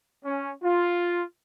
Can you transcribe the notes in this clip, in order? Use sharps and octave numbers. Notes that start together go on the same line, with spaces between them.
C#4
F4